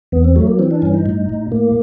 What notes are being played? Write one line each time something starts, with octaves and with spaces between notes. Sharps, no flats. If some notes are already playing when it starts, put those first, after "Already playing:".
E2 B3
C4
F#3 A3
A#3
E3 C4
D4
G2 C#4
D#4
A2
A2
A2 A#3